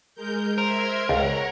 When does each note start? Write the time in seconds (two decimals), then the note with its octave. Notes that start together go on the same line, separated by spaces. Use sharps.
0.15 G#3 A#4 G6
0.58 A#4 C5 E5 C6 G#6
1.09 C#2 C#5 F#5